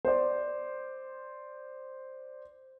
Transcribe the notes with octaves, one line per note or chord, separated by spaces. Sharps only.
C5 D5